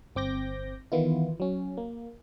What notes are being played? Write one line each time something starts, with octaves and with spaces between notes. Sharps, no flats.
G1 C4 D6 G6 A#6
D#3 E3 B3 E4 F4
F#3 C#4
A#3